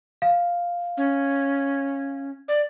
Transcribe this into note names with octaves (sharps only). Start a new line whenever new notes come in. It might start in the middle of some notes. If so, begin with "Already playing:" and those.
F5
C#4
D5